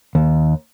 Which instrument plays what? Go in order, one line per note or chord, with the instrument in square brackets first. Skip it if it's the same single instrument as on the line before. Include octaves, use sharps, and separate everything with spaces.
[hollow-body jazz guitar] D#2